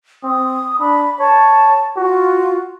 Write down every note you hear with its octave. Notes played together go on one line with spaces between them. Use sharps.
C4 D#6
D4 B5
C#5 A5
F4 F#4